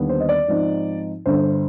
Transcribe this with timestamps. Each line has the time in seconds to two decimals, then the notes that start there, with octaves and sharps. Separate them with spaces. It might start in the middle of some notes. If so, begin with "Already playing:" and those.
Already playing: D#2 D3 G3 B3
0.09 C5
0.20 D#5
0.29 D5
0.48 G#2 F3 C4 D#4
1.26 G1 G2 D3 C5